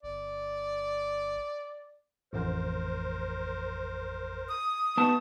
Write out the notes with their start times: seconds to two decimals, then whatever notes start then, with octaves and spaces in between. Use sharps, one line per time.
0.03 G1 D5
2.33 A1 F2 A#4 C5
4.49 D#6
4.97 A3 B3 D#4 A5 C#6